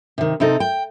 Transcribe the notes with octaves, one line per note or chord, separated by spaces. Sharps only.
C3 D#3
C3 C4 D#4 A4
G5